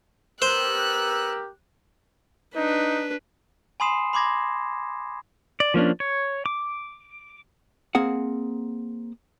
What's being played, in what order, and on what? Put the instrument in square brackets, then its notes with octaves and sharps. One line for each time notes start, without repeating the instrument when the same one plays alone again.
[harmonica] B3 E6 [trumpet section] G4 A#4 [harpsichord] C5 [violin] F#6
[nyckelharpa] D4 B4 [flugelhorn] D#4
[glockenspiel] G#5 B5 C6 D#6 C7 E7
B5 C6 D6 G#6 A#6
[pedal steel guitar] D5
F3 A#3 C#4 D4
C#5
D6
[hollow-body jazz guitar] A#3 C4 G#4 F#5